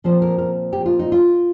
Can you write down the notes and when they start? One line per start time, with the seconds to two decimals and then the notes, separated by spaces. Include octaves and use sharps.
0.04 A#2 F3 C4 C5
0.22 A#4
0.38 A#4
0.73 G4
0.86 F4
0.99 D#4
1.12 F4